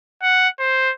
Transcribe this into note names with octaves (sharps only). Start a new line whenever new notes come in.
F#5
C5